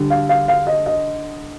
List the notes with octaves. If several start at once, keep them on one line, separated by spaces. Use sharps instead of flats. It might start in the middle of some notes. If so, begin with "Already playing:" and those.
Already playing: D3 G3
F5
F5
F5
D#5
D#5